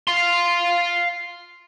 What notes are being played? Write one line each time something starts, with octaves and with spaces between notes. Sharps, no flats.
F5 C6